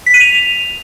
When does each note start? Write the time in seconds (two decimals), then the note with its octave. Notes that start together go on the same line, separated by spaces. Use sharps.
0.06 B6
0.14 D#7
0.21 F7